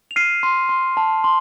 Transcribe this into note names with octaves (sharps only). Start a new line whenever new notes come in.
F7
F6 C7 D#7
C6
C6
A5
C6